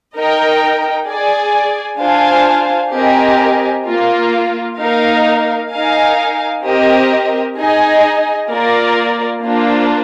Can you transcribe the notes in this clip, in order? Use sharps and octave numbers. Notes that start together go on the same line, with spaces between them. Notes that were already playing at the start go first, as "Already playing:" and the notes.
D#4 A#4 D#5 G5
G#4 D5 G#5
D4 F4 C5 F5 G#5
C4 G4 A#4 D#5 G#5
A#3 F4 A#4
A#3 D#4 A#4 F5
D#4 A#4 F5 G#5
C4 G4 A#4 D#5
D#4 G#4 D#5 G#5
A#3 F4 A#4 D5
A#3 D4 F4 C5